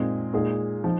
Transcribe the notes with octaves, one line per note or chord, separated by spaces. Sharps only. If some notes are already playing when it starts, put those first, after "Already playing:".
Already playing: A#2 G#3 C4 D#4 G#4
A#2 G#3 D#4 G#4
F3 D#4